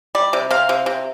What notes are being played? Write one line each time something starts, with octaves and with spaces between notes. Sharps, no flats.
G3 D5
C3
C3 F5
C3
C3